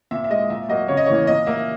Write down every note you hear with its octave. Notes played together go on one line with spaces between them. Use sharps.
A#2 E5
E5
G#3 D#5
A#2 E5
F#3 A#3 D#5
C#3 C#5
D#5
E3 A#3 C#5
A#2 D#5
A#3 E5